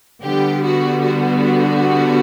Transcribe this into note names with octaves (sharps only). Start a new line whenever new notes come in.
D3 G3 B3 G4
F#4
F#4